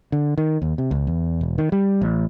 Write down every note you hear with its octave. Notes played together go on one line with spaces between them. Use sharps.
D3
D#3
D#2
C3
C#2
E2
E1
D#3
G3
A1